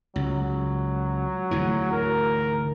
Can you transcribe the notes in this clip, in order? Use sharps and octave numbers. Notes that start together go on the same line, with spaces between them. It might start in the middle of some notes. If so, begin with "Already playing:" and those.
C#2 F#3
D2 G#2 E3
A#4